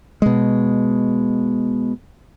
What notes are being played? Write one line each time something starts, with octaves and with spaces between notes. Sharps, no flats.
B2 G#3